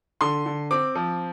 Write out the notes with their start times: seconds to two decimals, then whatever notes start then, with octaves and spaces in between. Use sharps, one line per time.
0.21 D3 C6
0.46 D3
0.71 C4 D6
0.95 F3